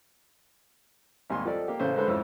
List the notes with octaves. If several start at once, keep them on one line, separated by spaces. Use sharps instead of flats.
G#1 D#2 G3 G#5 C6
F3 G4 A4 D5 D#5
A#3 G4
A1 C#3 C#4 A4 C5
D3 G#3 C#4 A4 B4 C5
F2 G#2 C#4 E4 E6